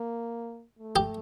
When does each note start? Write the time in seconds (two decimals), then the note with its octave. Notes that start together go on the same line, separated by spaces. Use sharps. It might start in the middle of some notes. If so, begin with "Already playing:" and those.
Already playing: A#3
0.79 A3
0.96 G4